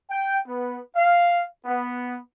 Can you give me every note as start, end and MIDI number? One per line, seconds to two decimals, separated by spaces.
0.11 0.39 79
0.47 0.80 59
0.96 1.42 77
1.65 2.18 59